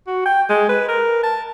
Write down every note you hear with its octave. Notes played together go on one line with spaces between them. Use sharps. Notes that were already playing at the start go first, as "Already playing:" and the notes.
F#4
G5
G#3
B4
A#4
A5